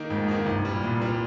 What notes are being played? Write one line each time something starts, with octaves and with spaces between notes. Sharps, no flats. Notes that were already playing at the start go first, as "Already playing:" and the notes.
Already playing: D#3 A#3 D#4
F2 G#2
D#3 A#3 D#4
C2 G2
A#2 G3
C2 A#2
A#2 G3